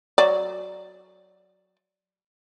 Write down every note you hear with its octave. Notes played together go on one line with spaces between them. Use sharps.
F#3 D5